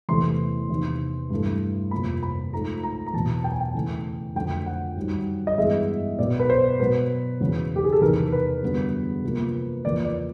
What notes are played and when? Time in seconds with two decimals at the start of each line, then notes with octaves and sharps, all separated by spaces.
0.09 E2 C3 E3 A3 C6
0.69 E2 C3 D#3
1.30 G2 E3 A3
1.91 F2 C3 F3 A#3 B5
2.23 B5
2.53 G#2 F3 A3 A#5
2.83 A#5
3.06 A#5
3.13 E2 B2 F#3 A5
3.44 G5
3.52 G#5
3.61 G5
3.75 C#3 E3 A3
4.35 F2 D3 F#3 A3 G5
4.66 F#5
4.96 F#2 D#3 G3
5.47 D#5
5.57 G2 E3 G#3 B3 E5
6.18 B2 F#3 B3 D5
6.39 B4
6.50 C5
6.80 B2 F#3 B3 B4
7.41 E2 C#3 F#3
7.76 G4
7.84 G#4
7.93 A4
8.01 E2 C3 D#3 A#4
8.32 B4
8.63 F#2 D3 G3 B3
9.24 C3 F3 A#3
9.85 E2 C#3 F3 A#3 D5
10.05 D5